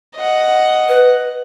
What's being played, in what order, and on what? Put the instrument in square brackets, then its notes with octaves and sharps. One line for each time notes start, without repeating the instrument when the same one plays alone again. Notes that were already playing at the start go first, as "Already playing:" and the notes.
[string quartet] D#5 F#5
[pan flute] B4